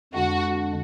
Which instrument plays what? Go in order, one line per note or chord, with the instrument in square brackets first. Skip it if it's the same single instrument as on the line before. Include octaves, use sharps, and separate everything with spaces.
[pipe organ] F2 D3 G#3 D4 [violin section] F#4